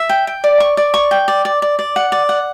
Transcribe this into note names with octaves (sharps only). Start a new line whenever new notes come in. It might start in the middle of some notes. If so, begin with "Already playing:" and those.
Already playing: E5
G5
G5
D5
C#6
D5
C#6
G5
D5
D5
D5
D5
F#5
D5
F#5